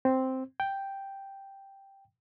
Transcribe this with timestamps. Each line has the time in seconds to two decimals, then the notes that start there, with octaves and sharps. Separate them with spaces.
0.05 C4
0.60 G5